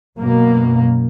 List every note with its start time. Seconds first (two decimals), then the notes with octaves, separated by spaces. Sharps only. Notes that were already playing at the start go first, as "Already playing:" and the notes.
0.17 F#2 B2 A#3